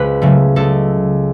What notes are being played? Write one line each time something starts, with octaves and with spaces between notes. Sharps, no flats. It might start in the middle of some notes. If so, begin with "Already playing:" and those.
Already playing: C#2 B4
C#3 F#3 A3
C#2 A4